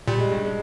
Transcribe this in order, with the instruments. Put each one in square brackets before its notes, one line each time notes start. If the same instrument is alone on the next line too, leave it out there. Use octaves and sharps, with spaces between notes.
[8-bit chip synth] A#2 [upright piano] G3
[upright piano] G#3
G2 G3
G#3